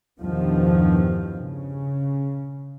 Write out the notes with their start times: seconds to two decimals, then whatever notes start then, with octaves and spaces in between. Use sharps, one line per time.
0.19 E2 G2 B2 D#3 F3
1.44 C#3